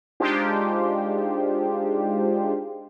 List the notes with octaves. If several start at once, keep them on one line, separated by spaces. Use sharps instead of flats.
G#3 D4 D#4 F4 G4 C5